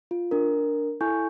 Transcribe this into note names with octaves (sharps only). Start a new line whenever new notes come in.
F4
D4 A#4
E4 A4 G#5 C#6 G6